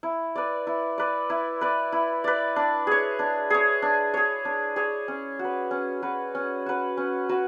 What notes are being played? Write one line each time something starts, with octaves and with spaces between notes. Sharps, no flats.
E4
B4 D5
E4
B4 D5
E4
B4 D5
E4
B4 D5
D4
G#4 C#5
D4
G#4 C#5
D4
G#4 C#5
D4
G#4 C#5
C#4
F#4
B4
C#4
F#4 B4
C#4
F#4 B4
C#4
F#4 B4